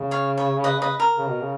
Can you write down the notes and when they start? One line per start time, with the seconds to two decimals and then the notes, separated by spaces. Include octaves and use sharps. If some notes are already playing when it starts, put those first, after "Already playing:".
Already playing: C#3
0.11 C#5 F5
0.37 C#5
0.64 B4 D#5
0.82 B4 D#5
1.00 A#4
1.17 C#3
1.29 B2
1.42 C#3